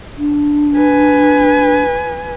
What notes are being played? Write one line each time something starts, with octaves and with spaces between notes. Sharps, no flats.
D4
B4 G#5